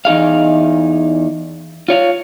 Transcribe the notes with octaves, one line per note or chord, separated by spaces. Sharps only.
E2 D#4 G#4 F5
F4 C#5 F5